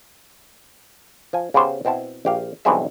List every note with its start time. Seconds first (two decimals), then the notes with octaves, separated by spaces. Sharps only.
1.33 F3 G#5
1.54 C#3 B3 G4 C5
1.85 B2 C4 E4 A5
2.25 A#1 G4 F5
2.65 B1 G2 E3 C4 G#4 E5